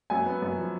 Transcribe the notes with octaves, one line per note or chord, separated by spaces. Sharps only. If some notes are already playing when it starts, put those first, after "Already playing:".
F#2 G#5
B3
F#2
F3